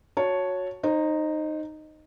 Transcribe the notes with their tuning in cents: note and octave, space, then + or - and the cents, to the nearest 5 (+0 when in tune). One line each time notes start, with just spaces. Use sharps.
F#4 -15 C#5 +0 A5 +0
D#4 -10 C5 +25